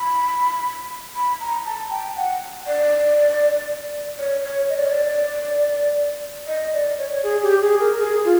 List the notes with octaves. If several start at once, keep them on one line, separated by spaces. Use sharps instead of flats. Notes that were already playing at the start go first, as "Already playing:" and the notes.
Already playing: B5
B5
A#5
A5
G5
F#5
D5
C#5
C#5
D#5
D5
C#5
D5
D#5
D5
C#5
G#4
G4
G#4
A#4
G#4
F4